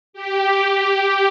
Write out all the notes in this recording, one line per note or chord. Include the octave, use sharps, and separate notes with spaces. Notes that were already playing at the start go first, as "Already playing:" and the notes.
G4